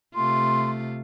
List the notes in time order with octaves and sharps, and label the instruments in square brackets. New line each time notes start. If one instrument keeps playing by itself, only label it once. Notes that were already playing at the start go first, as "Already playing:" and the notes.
[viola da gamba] C3 A3 F4 [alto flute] C6